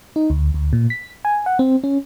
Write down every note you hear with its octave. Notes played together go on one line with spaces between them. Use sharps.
D#4
D2
D2
A#2
B6
G#5
F#5
C4
C#4